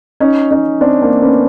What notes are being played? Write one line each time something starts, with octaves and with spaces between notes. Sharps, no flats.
C#4 D#4
C#4 D#4
C4 D4
A#3 C4
B3 C#4